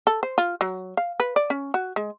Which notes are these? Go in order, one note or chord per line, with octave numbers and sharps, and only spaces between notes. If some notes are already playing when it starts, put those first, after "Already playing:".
A4
C5
F4
F#3
F5
B4
D5
C#4
F#4
G#3